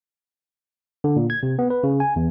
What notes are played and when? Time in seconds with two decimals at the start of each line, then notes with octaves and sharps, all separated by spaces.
1.04 D3
1.16 A#2
1.30 G#6
1.43 C3
1.59 B3
1.70 B4
1.84 C#3
2.00 G#5
2.16 E2